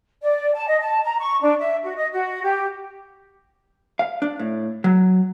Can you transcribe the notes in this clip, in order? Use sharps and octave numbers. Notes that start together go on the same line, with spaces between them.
D5
A5
D#5
A5
A#5
C#6
D4
E5
F#4
D#5
F#4
G4
F5
D4
A2
F#3